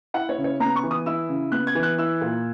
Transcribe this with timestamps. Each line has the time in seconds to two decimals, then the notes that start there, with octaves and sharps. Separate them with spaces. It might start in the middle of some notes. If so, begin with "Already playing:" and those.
0.14 E4 F#5
0.29 C#5
0.38 C#3
0.44 C#5
0.60 B3 A#5
0.76 C#6
0.83 E3
0.91 D#6
1.06 E4 E6
1.29 C#3
1.52 B3 F#6
1.67 G#6
1.75 E3
1.83 F#6
1.98 E4 E6
2.21 A#2